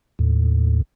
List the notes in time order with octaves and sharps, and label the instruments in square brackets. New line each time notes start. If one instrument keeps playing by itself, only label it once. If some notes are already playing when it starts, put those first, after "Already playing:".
[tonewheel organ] D#2 A2